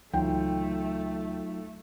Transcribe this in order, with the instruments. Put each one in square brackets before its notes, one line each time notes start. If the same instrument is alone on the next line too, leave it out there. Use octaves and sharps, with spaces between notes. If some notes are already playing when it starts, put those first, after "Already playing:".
[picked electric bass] C#2 E3 [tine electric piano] F#3 D#4 F4 [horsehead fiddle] A3 [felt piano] G5